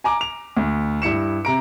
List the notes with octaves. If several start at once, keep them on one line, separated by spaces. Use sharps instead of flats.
G#5 A#5 D6
F7
D2
G2 E4 C#7 E7
C3 A#5 D7